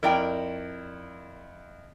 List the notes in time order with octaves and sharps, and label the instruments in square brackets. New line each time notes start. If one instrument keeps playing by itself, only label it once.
[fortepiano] F2 E4 [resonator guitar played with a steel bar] A#4 D5 G5